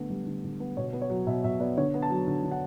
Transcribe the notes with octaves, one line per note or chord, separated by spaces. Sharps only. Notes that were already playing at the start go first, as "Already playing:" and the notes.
Already playing: D3 A3 B3
G3
D3
D3
B3
B2 C#5
B3
C#5
F#3
B2 E5
B2 E5
B3 D5
D3 C#5
B3
A5
F#3
D3
D3
F#5